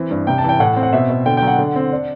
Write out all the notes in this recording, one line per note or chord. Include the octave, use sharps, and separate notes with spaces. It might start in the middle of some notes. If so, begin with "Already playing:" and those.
Already playing: E3 C4
G2
C3 G5
A5
E3 G5
A2 F#5
C4
F#5
B2 E5
B2
D3 G5
G5
F#3
F#5
D3
C4
D4